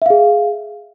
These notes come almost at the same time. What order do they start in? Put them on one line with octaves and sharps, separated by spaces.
E5 F5 G#4